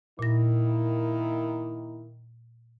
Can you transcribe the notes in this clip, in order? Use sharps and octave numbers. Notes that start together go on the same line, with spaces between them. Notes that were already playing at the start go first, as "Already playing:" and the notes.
A#2 D#3 A#3 E4 A#6